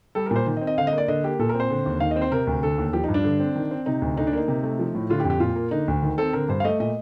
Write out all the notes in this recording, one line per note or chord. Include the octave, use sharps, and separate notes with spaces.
G3 A4
A#4
A#2
C5
D#3
D#5
C4
D#5
D3 F5
D#5
A#3
D5
D3 D#5
A#3 G4
A#2 A4
A#4
C4
C5
D3
D#2
D#3 F5
D#5
C4
C5
C3 A#4
D2
D3 A4
D#2
F3 G4
D#4
G2
D4
D3
C4
D#3
C4
C3 D#4
D2
D3 D#4
D4
A#3 D#4
C3
A3
F3
A2
D3 F4
G4
F2
G4
A#2 F4
A#3
D3 D#4
D2
D#3
C4 A4
D3 A#4
G2 C5
F5
A3 D#5
A#2 D#5